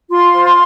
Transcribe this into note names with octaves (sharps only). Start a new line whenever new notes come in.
F4 C6
C5
C6